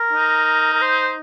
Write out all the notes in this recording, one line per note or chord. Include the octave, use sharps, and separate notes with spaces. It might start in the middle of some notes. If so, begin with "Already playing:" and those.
Already playing: A#4
D#4
A#4
C5